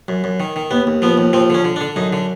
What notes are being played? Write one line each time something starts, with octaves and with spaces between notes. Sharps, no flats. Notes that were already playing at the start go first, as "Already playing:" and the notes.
F#2
F#2
D#3
D#3
D#2 B3
D#2
F3 B3
D#2
F3 C4
D3 C#4
D3
D4
D3
F#2 D#4
D3